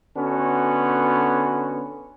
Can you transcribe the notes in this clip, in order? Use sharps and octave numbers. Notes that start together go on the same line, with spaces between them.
D3 B3 C#4 F#4